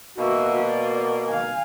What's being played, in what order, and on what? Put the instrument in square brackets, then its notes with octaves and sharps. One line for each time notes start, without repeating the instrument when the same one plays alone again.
[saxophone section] B2 A#3 [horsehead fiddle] F#4 E5
[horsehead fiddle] D5
F5 G#5